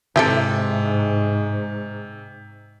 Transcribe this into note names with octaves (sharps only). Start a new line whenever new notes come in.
G#2 C3 E4 G4 A4